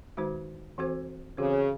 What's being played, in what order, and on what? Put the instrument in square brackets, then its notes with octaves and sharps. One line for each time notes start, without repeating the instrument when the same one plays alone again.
[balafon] D#3 G#3 D#4 F#4 C5
E3 C4 F#4 A4 C5
[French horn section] C#3 [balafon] E3 C4 F#4 A4 C5